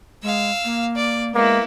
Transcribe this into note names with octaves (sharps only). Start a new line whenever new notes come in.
G#3 F5 E6
A#3
D5
G#3 A#3 B3 E4